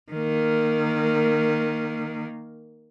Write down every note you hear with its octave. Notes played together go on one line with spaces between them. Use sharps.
D#3 A#3